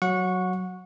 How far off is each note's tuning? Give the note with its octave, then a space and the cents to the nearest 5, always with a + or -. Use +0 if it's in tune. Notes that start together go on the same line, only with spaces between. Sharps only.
F#3 +0 F#5 -25 C#6 +0